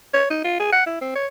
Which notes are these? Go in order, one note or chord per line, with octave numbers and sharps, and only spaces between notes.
C#5
D#4
F4
G#4
F#5
E4
C4
C#5